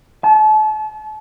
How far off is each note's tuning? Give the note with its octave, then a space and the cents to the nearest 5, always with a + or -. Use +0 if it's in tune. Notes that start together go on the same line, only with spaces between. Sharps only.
A5 -35